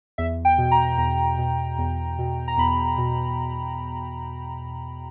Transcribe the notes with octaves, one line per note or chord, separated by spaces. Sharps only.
E2 E5
G5
B2
A#5
E2 A#5
B2
E2
B2
A#5
E2 B5
B2